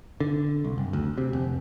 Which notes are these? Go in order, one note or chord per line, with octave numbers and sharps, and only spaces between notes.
D3
C2
F#1
D2
C3
F1